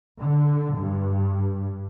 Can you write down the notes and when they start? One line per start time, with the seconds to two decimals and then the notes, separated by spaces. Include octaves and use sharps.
0.21 D3
0.77 G2